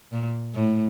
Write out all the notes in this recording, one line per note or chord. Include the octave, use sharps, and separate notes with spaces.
A#2
A2